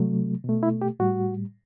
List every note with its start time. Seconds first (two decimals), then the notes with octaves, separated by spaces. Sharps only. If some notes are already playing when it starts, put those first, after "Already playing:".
Already playing: C3 F#3 A3
0.44 B2 A3
0.63 E4
0.82 G4
1.00 A2 G3 F#4